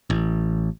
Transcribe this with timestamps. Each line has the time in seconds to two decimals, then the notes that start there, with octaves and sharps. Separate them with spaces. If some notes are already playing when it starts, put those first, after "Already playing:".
0.10 A1